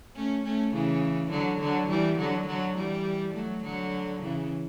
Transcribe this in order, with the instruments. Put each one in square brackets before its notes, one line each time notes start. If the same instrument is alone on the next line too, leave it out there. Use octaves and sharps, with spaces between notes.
[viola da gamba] A3 C#4
A3 C#4
C#3 E3
D3 F#3
D3 F#3
E3 G3
D3 F#3
D3 F#3
E3 G3
F#3 A3
D3 F#3
C#3 E3